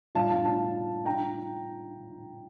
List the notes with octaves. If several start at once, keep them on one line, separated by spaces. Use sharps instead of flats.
A2 G3 D4 F4 F5 A5
F5 A5
F5 A5
G5 A#5